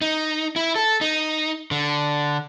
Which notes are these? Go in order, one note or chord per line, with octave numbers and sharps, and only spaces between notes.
D#4
E4
A4
D#4
D3